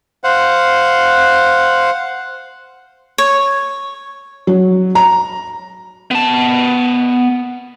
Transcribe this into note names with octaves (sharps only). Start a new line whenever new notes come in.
C5 F5 F#5
C#5
F#3
A#5
B3 A5